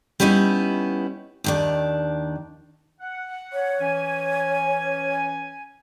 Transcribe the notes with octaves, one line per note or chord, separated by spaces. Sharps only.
G3 B3 C#4 D#4 E4
D#2 D#3 D4
F#5
C#5
E3 C#4 G#5